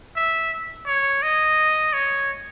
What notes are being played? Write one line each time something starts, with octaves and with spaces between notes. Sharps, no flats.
E5
C#5
D#5
C#5